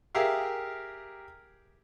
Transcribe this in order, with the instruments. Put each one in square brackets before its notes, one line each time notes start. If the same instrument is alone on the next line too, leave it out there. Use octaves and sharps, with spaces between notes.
[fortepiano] G4 G#4 A#4 E5 F5